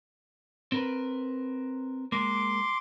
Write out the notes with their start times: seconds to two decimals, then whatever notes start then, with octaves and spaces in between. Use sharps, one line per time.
0.72 C4 A#4 B4
2.12 G#3 A#3 C6 D6